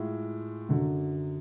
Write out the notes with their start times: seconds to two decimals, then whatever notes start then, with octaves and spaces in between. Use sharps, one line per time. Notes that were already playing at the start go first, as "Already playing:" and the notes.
Already playing: A2 G#3 F4
0.69 F#2 D3 F#3